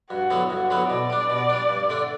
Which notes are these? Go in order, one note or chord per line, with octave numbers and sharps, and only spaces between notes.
G2 F#4
D3 F#3 B3 E4
G2 F#4
D3 F#3 B3 E4
B2 D5
G3 D4
B2
G3 D4
G2
D3 A3 D4